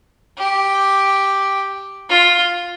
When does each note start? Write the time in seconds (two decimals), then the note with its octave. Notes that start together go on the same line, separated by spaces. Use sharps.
0.38 G4
2.09 F4